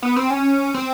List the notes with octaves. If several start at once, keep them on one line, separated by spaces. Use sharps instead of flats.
B3
C4
C#4
C4